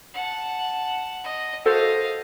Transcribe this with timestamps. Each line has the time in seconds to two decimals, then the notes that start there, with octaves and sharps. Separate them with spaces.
0.14 F#5 A5
1.24 D#5
1.65 F#4 A4 C5 D#5 F5